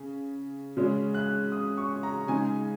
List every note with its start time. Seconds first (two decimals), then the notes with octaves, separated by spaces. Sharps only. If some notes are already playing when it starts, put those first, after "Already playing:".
Already playing: C#3
0.77 C#3 G#3 C#4
1.14 F#6
1.52 D#6
1.77 C#6
2.03 A#5
2.28 C#3 G#3 D#4 G#5